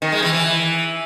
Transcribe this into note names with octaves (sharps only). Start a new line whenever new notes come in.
D#3
G#3
E3
E3